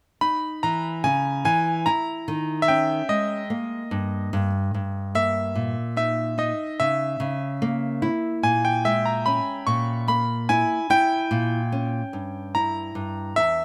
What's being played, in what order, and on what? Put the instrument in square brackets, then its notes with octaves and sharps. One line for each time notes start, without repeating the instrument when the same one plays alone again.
[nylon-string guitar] D#4 [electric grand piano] B5
[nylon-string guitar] E3 [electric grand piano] A#5
[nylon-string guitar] C#3 [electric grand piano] G#5
[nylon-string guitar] E3 [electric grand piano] G#5
[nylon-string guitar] E4 [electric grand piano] A#5
[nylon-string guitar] D#3
[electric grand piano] E5
[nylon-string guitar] C#4 [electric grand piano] G5
[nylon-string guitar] G#3 [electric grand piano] D#5
[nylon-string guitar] A#3
G2
G2
G2
[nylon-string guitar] A#3 [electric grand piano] E5
[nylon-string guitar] A#2
[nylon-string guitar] D#4 [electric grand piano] E5
[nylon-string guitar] D#4 [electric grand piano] D#5
[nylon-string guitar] C#3 [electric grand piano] E5
[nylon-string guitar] C#3
A#3
E4
[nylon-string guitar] A#2 [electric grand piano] G#5
[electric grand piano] G5
[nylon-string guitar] G#3 [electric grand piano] E5
[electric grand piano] A#5
[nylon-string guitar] C#4 [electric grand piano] B5
[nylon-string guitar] A#2 [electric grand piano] C#6
[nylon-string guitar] A#3 [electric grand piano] B5
[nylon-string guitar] E4 [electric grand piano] G#5
[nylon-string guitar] E4 [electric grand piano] G5
[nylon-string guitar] A#2
C#4
G2
[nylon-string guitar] E4 [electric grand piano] A#5
[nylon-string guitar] G2
[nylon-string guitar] E2 [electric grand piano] E5